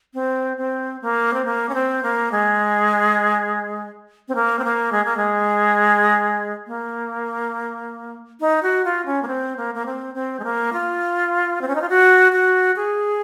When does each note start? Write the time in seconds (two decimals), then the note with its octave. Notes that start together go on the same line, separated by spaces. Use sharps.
0.14 C4
0.58 C4
1.02 A#3
1.34 C4
1.45 A#3
1.69 C#4
1.74 C4
2.03 A#3
2.32 G#3
4.28 C4
4.35 A#3
4.59 C4
4.64 A#3
4.92 G#3
5.05 A#3
5.17 G#3
6.67 A#3
8.40 D#4
8.63 F#4
8.85 F4
9.06 C#4
9.22 A#3
9.28 C4
9.57 A#3
9.74 A#3
9.86 C4
10.15 C4
10.40 G#3
10.44 A#3
10.73 F4
11.61 C4
11.68 C#4
11.75 D#4
11.81 F4
11.89 F#4
12.32 F#4
12.76 G#4